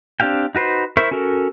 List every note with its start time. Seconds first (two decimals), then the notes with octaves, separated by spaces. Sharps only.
0.20 C4 D4 G4 F5 G5
0.55 D#4 F#4 B4 C5
0.97 E4 A#4 C5 E5 C#6
1.11 C#4 F#4 A4 A#4